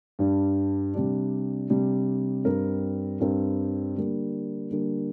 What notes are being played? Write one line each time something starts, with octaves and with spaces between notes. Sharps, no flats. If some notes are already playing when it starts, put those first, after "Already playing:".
G2 G3 D4
C3 G3 D4
C3 G3 D4
G2 G3 C4 A#4
G2 G3 C4 A#4
D3 G3 A#3
D3 G3 A#3